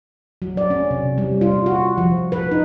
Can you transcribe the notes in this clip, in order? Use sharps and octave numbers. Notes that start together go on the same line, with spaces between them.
F#3
D5
C#4
C3
G3
F4
F#4
F3
B4
D#4